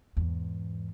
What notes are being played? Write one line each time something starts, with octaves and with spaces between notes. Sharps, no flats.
E2 G#2